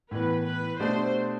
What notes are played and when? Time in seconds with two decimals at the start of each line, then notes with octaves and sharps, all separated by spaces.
0.11 A2 E3 B3 B4
0.45 B4
0.80 B2 A3 D4 G4 C5 D5